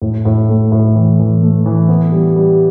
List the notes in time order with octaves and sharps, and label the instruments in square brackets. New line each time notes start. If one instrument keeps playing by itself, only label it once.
[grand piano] A2
A2
A3
A2
E3
E3
A3
E3
B3
G3
G3